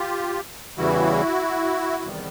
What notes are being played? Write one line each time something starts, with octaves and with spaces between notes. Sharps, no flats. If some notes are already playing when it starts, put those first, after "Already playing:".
Already playing: F4 G4
E2 C#3 E3 G3 E4 F#4
E2 C3 D#3 G3 B3